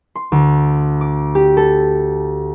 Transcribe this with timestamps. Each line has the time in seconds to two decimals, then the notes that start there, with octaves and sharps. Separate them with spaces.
0.15 C6
0.32 D2
1.01 D6
1.35 G4
1.57 A4